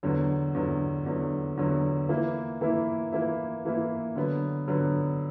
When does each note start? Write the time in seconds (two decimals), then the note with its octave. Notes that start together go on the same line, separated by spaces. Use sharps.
0.03 E2 D3 F#3
0.54 E2 D3 F#3
1.06 E2 D3 F#3
1.57 E2 D3 F#3
2.09 E3 A#3 E4
2.61 E3 A#3 E4
3.12 E3 A#3 E4
3.65 E3 A#3 E4
4.16 D3 F#3 B3
4.68 D3 F#3 B3